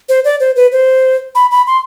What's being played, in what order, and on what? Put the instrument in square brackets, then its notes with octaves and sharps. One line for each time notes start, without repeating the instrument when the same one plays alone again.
[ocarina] C5
D5
C5
B4
C5
B5
B5
C6